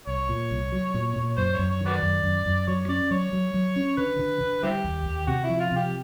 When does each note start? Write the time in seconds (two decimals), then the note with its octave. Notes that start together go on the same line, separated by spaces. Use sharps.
0.07 C2 C#5
0.29 A#2
0.51 C2
0.72 F#3
0.94 A#2
1.16 A#2
1.37 F#2 C5
1.54 C#5
1.59 F#2
1.70 C#5
1.81 D#3
1.86 F#4 B4 D5
2.03 F#2
2.24 F#2
2.46 F#2
2.67 F#3 C#5
2.89 C#4 D5
3.11 F#3 C#5
3.33 F#3
3.54 F#3
3.76 C#4
3.97 D3 B4
4.19 D3
4.41 D3
4.63 G3 C4 E4 G4
4.84 D#2
5.06 D#2
5.27 C3 F#4
5.44 E4
5.49 F3
5.60 F4
5.71 C3
5.76 G4